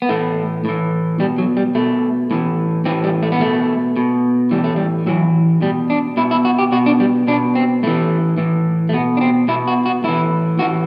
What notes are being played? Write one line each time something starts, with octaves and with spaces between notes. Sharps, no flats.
B3
A2 E3 A3
A2 E3
B2 G3
F#3
G3
B2 A3
A2 E3
A2 E3 C4
G3
A3
B3
B2 A3
B2
A2 E3 G3
A3
G3
A2 E3 F#3
B2 G3
D4
B2 E4
E4
F#4
G4
B2 F#4
D4
G3
B2 D4
C4
A2 E3 A3
A2 E3
A3
B2 B3
D4
C4
B2 E4
F#4
F#4
A2 E3 E4
A2 E3 F#4